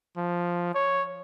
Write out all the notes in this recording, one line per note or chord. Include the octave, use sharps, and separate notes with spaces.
F3
C#5